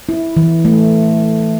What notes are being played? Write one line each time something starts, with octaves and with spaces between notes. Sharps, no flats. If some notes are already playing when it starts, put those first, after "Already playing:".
E4
E3
A3